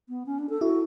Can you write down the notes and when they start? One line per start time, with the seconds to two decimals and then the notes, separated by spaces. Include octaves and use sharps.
0.09 B3
0.26 C#4
0.38 D4
0.49 A4
0.61 E4 F#4